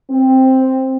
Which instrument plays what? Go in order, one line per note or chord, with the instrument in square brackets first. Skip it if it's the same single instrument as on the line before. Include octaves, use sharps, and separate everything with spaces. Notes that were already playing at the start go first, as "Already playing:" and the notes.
[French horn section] C4